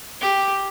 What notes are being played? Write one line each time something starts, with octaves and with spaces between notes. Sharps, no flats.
G4